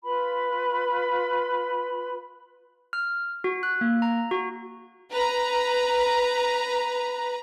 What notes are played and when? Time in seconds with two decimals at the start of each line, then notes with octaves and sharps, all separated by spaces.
0.03 F4 B4 B5
2.93 F6
3.44 F#4
3.63 F#6
3.81 A#3
4.02 A#5
4.31 F#4
5.12 B4 A#5